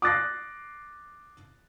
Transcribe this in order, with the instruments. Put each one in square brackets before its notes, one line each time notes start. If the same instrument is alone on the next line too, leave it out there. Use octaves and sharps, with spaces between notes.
[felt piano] D6 D#6 F#6 A6 A#6 C7